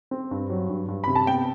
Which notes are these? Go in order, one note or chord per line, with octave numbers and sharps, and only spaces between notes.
C4
G2
F#3
G2
G2
C3 B5
A5
B3 G5